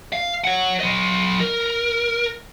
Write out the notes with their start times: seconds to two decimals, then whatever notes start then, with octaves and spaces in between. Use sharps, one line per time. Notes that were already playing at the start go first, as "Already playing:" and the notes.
0.13 F5
0.44 C#5 F#5
0.80 F#3 D#5
1.40 A#4